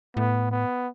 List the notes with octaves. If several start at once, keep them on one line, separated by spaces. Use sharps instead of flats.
A2 B3
B3